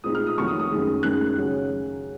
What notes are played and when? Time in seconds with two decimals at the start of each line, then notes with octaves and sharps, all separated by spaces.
0.04 A#2 G#3 C4 D#4 D#6
0.15 F6
0.27 D#6
0.37 F2 C3 D#3 F#3 C#6
0.48 D#6
0.60 D#6
0.71 F#2 D#3 G#3
1.03 F#2 D#3 G#3 F#6
1.37 C#3 F#3 C#4